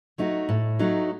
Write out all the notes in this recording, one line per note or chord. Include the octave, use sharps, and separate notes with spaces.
F#3 A3 D#4 F#4
A2
F#3 A3 D#4 F#4